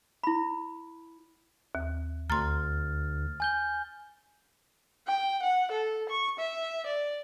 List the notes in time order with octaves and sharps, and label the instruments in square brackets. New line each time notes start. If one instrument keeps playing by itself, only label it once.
[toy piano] E4 B5
[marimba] D#2
[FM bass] D2 [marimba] A#5 C6 [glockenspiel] F6 A6
[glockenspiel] G#5 G6 G7
[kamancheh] G5
F#5
A4
C#6
E5
D5